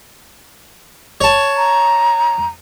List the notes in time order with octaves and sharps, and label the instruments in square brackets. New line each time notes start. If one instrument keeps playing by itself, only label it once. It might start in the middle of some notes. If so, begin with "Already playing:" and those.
[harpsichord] C#5 A5
[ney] A#5